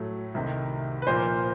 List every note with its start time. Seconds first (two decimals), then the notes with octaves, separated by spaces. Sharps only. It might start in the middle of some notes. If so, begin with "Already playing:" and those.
Already playing: A2 F#3 A3
0.34 C2 C3 D#3
1.02 B4
1.07 A#2 F3 A#3 C5